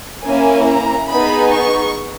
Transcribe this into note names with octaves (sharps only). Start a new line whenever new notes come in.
A#3 C#4 E4 G#5
A#5
B3 D#4 G#4 B5
C#6